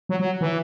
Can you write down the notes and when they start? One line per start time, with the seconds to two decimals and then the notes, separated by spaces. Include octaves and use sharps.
0.09 F#3
0.20 F#3
0.41 E3